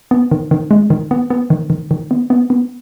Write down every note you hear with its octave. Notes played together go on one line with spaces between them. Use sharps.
B3
D#3
D#3
G#3
D#3
B3
B3
D#3
D#3
D#3
B3
B3
B3